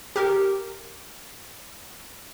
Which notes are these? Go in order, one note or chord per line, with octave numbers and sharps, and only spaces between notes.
G4 A#4